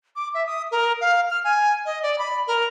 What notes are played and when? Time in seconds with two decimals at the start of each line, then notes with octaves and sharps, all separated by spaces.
0.16 D6
0.34 E5
0.46 D#6
0.71 A#4
1.01 F5
1.30 F6
1.44 G#5
1.86 D#5
2.03 D5
2.18 B5
2.48 A#4